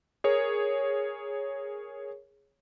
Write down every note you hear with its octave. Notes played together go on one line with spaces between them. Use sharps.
G#4 A#4 C#5